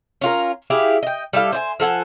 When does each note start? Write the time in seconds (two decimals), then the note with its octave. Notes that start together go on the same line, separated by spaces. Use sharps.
0.21 C#4 F4 A#4
0.70 E4 G4 G#4 F5
1.03 D#5 G5
1.33 G3 E4 A4 F5
1.52 C5 D5 G#5
1.80 F3 A4 F#5 G#5